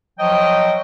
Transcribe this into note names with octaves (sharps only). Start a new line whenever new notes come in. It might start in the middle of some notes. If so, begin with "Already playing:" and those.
F3 F#3 D#5 G5